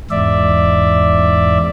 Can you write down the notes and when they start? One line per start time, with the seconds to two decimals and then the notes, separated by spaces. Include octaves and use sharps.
0.11 E2 G#2 D5 E5